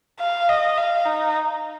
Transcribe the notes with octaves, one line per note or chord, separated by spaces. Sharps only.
F5
D#5
F5
D#4